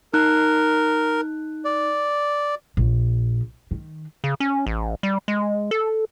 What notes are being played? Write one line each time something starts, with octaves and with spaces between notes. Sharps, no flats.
D#4 A#4 F#6
D5
A#1
D#3
C#3
C#4
A1
G3
G#3
A4